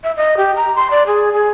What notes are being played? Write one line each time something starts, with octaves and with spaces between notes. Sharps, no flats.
E5
D#5
G4
A#5
C6
D5
G#4
G#4